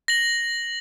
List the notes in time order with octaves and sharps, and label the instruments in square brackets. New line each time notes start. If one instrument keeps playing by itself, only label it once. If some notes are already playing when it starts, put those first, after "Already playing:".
[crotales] A#6 F#7